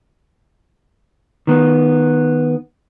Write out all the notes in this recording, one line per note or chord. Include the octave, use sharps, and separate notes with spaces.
D#3 B3